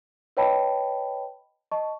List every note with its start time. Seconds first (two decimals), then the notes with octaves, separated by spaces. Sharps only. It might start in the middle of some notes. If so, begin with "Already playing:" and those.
0.37 B4 C#5 D#5 G5 A5 B5
1.71 D#5 A5 C#6